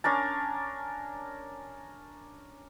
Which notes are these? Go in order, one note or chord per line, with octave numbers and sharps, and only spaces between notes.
C#4 D4 A#4 A5